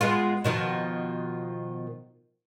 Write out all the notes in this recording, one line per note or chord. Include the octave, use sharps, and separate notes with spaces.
G#3 B3 F4
B2 D#3 F3